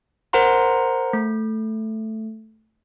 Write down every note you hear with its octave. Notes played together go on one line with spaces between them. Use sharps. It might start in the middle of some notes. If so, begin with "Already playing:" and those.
A#4 C5 F#5 A#5 C6
A3